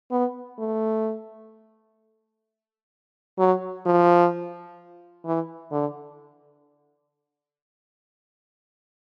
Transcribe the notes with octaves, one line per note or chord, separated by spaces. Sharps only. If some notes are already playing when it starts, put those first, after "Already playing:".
B3
A3
F#3
F3
E3
D3